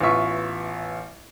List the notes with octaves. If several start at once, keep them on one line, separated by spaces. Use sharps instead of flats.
A1 B3 F4 E5 C#6